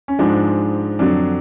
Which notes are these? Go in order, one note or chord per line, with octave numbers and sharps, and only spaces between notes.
C#4
G#2 F3 G#3 D4
F2 D3 F#3 D4